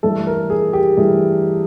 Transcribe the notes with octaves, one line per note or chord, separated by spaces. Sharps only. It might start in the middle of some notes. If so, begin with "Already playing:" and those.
G2 E3 A3 A4
A#4
G#4
G4
G2 E3 A3 G#4